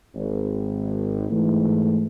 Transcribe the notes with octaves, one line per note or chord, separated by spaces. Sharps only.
G#1
G#2 E3 A3